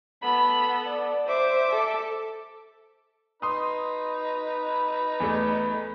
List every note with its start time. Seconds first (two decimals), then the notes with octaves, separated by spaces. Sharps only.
0.23 B3 A4 B5
0.88 D5
1.27 C5 E5 D6
1.71 A4
3.42 D#4 B4 B5 C6 D#6
5.20 E2 A3